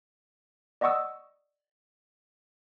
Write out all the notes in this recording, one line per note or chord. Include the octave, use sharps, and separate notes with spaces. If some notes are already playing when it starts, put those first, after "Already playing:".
D5 D#5 F#5 C#6 D#6 E6